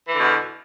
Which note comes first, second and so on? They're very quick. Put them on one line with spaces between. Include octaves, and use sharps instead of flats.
E3 D3 B2 E2